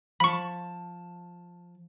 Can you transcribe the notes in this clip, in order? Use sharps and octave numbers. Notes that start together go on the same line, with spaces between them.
F3 A5 B5 C#6